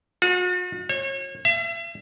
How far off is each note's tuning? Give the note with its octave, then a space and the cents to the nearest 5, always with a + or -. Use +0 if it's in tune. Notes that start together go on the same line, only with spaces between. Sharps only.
F#4 -45
C#5 -35
E5 +40